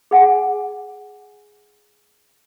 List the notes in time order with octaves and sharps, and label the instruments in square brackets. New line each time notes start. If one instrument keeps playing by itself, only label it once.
[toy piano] G#4 F#5 G#5